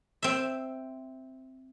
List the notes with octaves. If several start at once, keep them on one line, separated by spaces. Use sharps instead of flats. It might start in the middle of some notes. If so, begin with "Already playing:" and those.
C4 E5